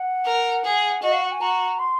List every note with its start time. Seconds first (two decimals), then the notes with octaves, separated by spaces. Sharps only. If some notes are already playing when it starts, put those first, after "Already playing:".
Already playing: F#5
0.26 A#4
0.64 G#4
1.02 F#4 D#5
1.12 F5
1.21 F#5
1.32 G#5
1.41 F#4 A#5
1.79 C6